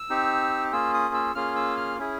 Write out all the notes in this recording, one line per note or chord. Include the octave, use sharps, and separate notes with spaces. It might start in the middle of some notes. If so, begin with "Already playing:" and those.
Already playing: E6
C4 D#4 G4
A#3 C#4 F4 G#4 E6
D#6
E6
A#3 C#4 F4 G#4 F6
E6
F6
C#4 E4 G#4